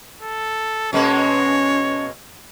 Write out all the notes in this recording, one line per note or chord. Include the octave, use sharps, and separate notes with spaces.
A4
B2 G#3 A#3 C#4 C#5